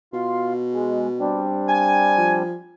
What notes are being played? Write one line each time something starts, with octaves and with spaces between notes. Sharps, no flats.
B2 F4 C6
G#3
G3 C4 D4
G#5
F3